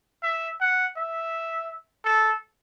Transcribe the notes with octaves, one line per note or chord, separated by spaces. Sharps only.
E5
F#5
E5
A4